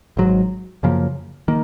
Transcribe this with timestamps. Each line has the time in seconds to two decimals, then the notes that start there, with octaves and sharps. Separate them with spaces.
0.17 G#1 G#2 F#3
0.83 F#2 C#3 F3 A#3
1.48 D#3 A#3